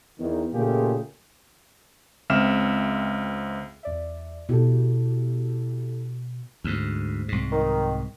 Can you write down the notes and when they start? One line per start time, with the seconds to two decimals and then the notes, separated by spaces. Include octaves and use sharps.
0.19 E2 D#3
0.54 A#2 C#3 A3 F4 G4 G#4
2.30 C#2 C4 E5 F6 E7
3.83 E2 D5 E5
4.49 B2 E4 G4 A4
6.64 D2 G#2
7.28 C2 G#2
7.52 D#3